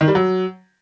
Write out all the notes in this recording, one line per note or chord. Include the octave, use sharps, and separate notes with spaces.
D#3
G3
F#3